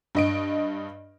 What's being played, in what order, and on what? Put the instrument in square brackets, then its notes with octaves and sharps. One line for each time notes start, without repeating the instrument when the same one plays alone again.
[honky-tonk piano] G2 D#5 D7